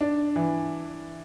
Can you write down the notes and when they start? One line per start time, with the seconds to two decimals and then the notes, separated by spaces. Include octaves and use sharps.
0.01 D4
0.36 E3